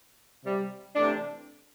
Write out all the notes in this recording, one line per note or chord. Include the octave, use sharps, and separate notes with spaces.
C3 G3
C3 E3 A3 D4